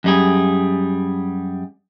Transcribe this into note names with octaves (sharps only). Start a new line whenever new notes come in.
F#2 G3 G#4